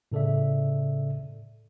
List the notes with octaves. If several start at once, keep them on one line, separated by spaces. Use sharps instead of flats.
A2 C#3 A4 D5 E5